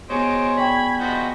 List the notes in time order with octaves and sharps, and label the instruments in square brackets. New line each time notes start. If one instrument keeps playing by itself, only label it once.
[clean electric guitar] B2 G#4 [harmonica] C5 C#5 D#5 [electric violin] D7
[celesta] D5 G5 C#6 [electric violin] B5 G#6
[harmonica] F3 F#4 D#5 [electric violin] B5 G6